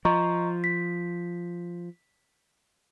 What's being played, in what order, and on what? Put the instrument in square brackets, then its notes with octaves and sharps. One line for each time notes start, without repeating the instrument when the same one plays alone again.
[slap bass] F3 [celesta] D#5 A#5 C#6
[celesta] B6